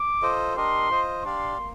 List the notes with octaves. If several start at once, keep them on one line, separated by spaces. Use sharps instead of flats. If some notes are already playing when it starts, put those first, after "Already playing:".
Already playing: D6
F4 A4 C5 D#5
D4 G4 A#4 D#5 C6
F4 C5 D#5
D4 G4 D5 F5 C6
A#3